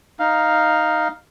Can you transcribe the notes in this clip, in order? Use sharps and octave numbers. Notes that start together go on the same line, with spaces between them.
D#4 F5